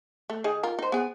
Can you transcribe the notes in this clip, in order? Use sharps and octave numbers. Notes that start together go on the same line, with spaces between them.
A3
D#3 G#4 D#5
F4 A#4
D#4 C5
B3 G#4